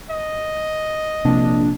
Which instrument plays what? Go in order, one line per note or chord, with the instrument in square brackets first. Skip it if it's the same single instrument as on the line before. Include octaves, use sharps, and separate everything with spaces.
[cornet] D#5
[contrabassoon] A#1 [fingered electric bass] C3 [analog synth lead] D4